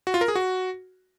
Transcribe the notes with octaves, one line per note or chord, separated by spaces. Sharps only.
F#4
F4
A#4
G#4
F#4